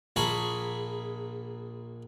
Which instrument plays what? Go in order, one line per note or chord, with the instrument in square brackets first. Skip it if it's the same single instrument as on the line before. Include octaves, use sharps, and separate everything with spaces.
[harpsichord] A#1 A#3 G#4 A5 B5 C#6